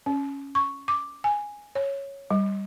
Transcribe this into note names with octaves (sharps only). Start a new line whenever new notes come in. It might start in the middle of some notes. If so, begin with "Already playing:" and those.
C#4
C#6
D6
G#5
C#5
G3